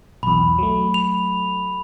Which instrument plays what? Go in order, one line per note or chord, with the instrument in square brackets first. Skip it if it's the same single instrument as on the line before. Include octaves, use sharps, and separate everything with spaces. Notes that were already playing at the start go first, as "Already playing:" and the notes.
[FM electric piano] B1 E2 [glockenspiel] B5
[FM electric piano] F#3 A3
[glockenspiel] F7